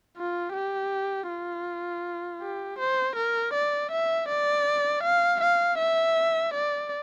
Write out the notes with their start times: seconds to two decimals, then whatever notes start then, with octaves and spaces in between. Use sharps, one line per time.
0.17 F4
0.54 G4
1.29 F4
2.41 G4
2.79 C5
3.16 A#4
3.54 D5
3.91 E5
4.29 D5
5.03 F5
5.41 F5
5.78 E5
6.54 D5